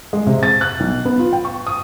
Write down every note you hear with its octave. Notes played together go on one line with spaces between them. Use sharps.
G#3
C3
A6
F#6
B1
B3
F4
G5
C#6
D#6